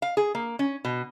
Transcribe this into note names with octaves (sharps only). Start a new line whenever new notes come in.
F5
G#4
A#3
C#4
B2